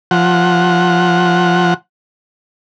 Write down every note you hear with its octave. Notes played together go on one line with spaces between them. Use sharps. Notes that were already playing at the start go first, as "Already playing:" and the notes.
F3 F#5